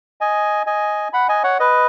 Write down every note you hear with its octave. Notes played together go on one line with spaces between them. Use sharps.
D#5 G#5
D#5 G#5
F#5 B5
D#5 G#5
C#5 F#5
B4 D#5